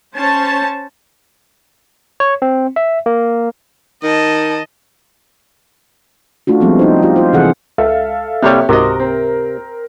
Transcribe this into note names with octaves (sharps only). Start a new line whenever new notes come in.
C#4 C5 C#5 A5
C#5
C4
E5
A#3
D#3 D#5 A5
A3 D4 F4 F#4
F3 G3 G#3 B3 C4
D#4 C5
F4 G4
F4 C5
C3 E3 G#4 A4 F#5
C#2 A4 E5 F5
C2 C3 G3 A#3 G4 C#5
C#2 G#2 C3 F#4 A#4 D#5
C4